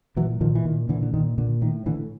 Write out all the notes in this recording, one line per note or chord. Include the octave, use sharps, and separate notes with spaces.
A#2 E3 F#3
A#2 D#3 F3
E3
A#2 D#3
A#2 D3 E3
D3
A#2 D#3
A#2 D3
A2 D#3
A2 D3 E3